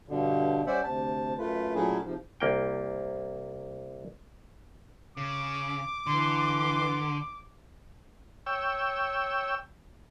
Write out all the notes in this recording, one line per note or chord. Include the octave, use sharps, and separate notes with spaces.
G2 B2 D3
G3 C#4 C5 D5 E5 F#5
D2 C3 A5
F#2 A3 F4 B4
A#2 F#3 A3 C#4 E4 G#4
G#2 C3 F3
C2 A#3 G5
C#3 D6
D3 E3 C6
C#5 G5 E6